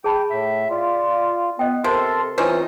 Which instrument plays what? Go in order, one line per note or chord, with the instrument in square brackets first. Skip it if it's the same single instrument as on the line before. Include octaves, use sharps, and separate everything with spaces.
[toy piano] G#4 A5 B5 [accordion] G5
[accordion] A2 [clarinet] E5
[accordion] F4 [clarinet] D5
[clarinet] B3 [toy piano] D#5 G5
[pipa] C3 [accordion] A4 A5 C6 [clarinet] A#4
[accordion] E3 [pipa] C4 C#4 D#4 [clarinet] F4